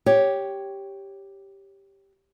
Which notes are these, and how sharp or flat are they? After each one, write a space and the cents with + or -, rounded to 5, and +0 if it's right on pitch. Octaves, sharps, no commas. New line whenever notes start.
G4 +0 C#5 +0